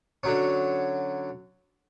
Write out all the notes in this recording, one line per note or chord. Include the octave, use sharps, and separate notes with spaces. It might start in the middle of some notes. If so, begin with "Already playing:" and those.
D3 F#3 C#4